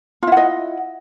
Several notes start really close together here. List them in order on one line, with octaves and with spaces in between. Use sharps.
F4 E4 F#5 D#5